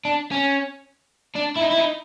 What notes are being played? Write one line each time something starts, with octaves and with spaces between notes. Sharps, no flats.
D4
C#4
D4
E4
D#4
E4
D#4